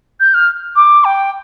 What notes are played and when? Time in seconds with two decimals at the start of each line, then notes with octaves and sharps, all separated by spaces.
0.20 G6
0.34 F6
0.76 D6
1.05 G5